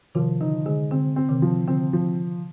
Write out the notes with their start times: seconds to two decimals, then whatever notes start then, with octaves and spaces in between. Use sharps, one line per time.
0.15 C3 D#3 F3
0.41 D3 D#4
0.66 D3 G#3
0.91 D3 C4
1.16 C4
1.29 C3 D#3
1.42 F3
1.68 D3 C4
1.93 F3